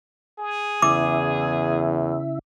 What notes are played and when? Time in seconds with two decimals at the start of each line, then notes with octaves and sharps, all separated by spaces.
0.38 G#4
0.82 E2 C#3 E4 E5 D6